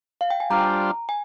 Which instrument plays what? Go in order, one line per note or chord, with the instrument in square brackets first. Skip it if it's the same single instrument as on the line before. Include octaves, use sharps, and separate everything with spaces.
[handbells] F5
G5
G#5
[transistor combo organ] G3 D4 F4 C5 [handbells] A#5
[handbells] G#5